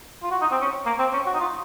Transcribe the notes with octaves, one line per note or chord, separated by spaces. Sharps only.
F4
F#4
D#4
C4
C#4
A#3
C4
C#4
F#4
D#4
F4